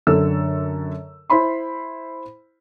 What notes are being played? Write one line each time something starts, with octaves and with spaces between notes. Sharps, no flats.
F#2 D3 A4 E6
E4 C5 B5 C6